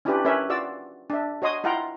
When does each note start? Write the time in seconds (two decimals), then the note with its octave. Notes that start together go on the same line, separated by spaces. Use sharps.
0.05 C#4 D4 E4 F4 G4 B4
0.25 C#4 A#4 B4 C#5 E5
0.50 F4 F#4 D5 E6
1.10 D4 E5
1.42 F#4 C#5 D#5 C6 D#6
1.64 E4 F4 F#5 G5 A#5